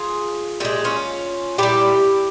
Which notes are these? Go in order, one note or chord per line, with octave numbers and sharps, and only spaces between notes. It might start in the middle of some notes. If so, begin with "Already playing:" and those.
Already playing: F4 G#4
A#2 G#3 E4 G4
C#4 F4
A#2 G3 E4 G4